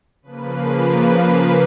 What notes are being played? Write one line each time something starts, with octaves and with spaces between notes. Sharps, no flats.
C#3 F3 A#3 B4
B4